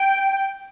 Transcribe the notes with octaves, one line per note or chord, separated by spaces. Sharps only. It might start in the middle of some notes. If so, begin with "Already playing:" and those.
Already playing: G5